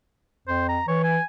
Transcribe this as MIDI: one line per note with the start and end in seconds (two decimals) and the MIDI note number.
0.48 0.79 41
0.48 0.67 72
0.68 0.87 82
0.88 1.18 52
0.88 1.01 73
1.03 1.23 80